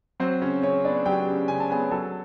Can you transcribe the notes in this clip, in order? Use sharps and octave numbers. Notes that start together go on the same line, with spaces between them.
F#3 C4 C5
C#3 C#4 C#5
C#3 C#4 C#5
B3 D4 D5
F#3 G4 G5
C#3
C#3 G#5
A5
B3 G#4 G#5
F#3 A4 A5